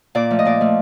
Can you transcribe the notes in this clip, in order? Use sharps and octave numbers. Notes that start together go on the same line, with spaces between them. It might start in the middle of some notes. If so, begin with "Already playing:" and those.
A#2 D5
F3 A3
D#5
A#2 D5
F3 A3